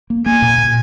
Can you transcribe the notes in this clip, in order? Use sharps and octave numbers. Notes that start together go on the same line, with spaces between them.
A#3
A#3 G#5
A#2
A#2